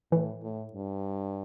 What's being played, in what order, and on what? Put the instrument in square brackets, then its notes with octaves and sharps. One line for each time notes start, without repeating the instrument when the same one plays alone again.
[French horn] A2 [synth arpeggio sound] E3
[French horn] A2
G2